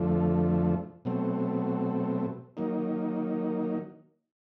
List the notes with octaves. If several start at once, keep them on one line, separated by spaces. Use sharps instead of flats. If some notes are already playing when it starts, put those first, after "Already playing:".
Already playing: F2 D3 F3 A3
B2 F#3 A3 C4
D#3 F#3 A#3 D#4